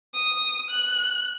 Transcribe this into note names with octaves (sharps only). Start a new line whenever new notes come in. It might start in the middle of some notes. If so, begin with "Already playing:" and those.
D#6
F#6